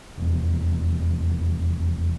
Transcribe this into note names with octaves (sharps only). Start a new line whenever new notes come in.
F1 E2